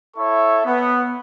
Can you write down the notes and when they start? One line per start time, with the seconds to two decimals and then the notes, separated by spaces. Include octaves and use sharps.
0.17 E4 A4 C#5 E5 C#6
0.66 B3